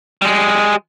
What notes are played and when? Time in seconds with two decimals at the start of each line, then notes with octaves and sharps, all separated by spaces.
0.22 G3 G#3